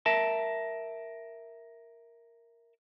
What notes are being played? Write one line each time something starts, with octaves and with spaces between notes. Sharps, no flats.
A#4 E5 A5